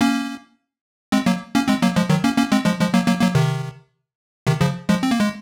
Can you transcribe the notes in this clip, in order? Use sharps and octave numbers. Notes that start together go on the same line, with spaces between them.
A#3 C#4
G#3 C4
F#3 A#3
A#3 C#4
G#3 C4
F#3 A#3
F3 G#3
D#3 F#3
A#3 C#4
A#3 C#4
G#3 C4
F3 G#3
F3 G#3
F#3 A#3
F#3 A#3
F#3 A#3
C3 D#3
C3 D#3
C#3 F3
F3 G#3
C4
A#3
G#3